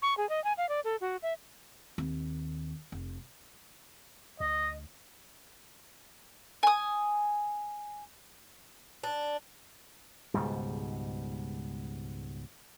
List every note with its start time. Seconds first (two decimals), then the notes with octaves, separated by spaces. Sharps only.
0.02 C#6
0.17 G#4
0.29 D#5
0.44 G#5
0.58 F5
0.69 D5
0.84 A4
1.01 F#4
1.23 E5
1.98 D#2 C4
2.92 F1
4.40 D2 D#5
6.63 G#5 D#6
9.04 D4
10.34 C#2 G#2 B2 G3